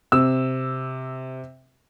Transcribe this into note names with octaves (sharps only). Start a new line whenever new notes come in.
C3 E6